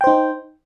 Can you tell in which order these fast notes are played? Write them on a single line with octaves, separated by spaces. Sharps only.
G5 C5 D#4